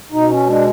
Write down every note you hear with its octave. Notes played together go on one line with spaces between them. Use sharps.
B2 D#4
C#4
G#3 D4